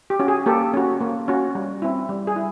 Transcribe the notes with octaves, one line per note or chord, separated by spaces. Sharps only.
G4
C#4 F#4
G#4
A#3 G4 A4
C#4 F#4
A#3
C#4 F#4
G3
C4 E4
G3
G#4
E4